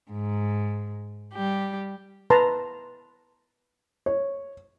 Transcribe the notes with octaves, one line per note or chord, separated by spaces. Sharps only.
G#2
G3 G4
B4 A5 A#5 C6
C#5